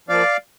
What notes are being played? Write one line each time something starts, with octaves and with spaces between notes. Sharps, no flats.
F3 A#3 D5 F5